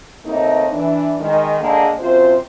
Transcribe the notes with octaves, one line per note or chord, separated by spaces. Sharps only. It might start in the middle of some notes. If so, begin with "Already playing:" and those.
A2 C3 A3 A#3 D#4
E3 D4
D#3 G#3
D3 G#3 A#3
F#2 C3 F4 C5